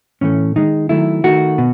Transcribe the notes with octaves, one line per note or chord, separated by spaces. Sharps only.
A2 E3 A3 C#4
D#3 G#3 D#4
D#3 F#3 A3 E4
D#3 A3 F#4
B2